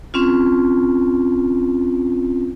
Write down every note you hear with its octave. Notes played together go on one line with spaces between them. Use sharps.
C4 C#4 F4